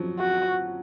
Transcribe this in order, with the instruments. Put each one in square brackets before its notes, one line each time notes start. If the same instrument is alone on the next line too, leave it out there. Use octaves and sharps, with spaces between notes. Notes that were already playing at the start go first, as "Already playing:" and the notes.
Already playing: [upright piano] F3 F#3
[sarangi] F#4